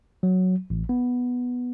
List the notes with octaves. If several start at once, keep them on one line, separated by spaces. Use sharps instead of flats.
F#3
A1
B3